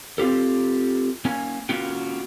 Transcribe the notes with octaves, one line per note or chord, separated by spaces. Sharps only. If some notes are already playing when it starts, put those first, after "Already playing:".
C4 F4 G4 A4
A#3 C#4 G#5
A#3 C#4 F4 F#4 G5